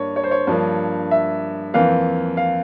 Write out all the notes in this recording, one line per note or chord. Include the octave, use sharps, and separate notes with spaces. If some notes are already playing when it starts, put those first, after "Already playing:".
Already playing: G2 A#3 C#5
C#5
C5
C#5
G2 F3 A#3
E5
F2 E3 A#3 F5
F5